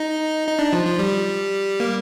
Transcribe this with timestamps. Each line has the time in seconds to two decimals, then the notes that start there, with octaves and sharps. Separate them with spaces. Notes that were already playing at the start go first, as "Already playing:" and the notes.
Already playing: D#4
0.48 D#4
0.59 D4
0.73 F3
0.85 F3
0.99 G3
1.80 A#3